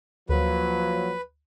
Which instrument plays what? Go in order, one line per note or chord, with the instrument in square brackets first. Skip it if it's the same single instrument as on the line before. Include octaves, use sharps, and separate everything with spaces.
[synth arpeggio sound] D2 [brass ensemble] F3 F#3 A#3 [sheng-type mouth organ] B4